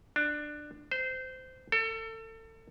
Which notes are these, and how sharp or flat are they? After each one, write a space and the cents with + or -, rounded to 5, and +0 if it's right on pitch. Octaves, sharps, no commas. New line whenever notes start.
D4 +15
C5 -20
A4 +30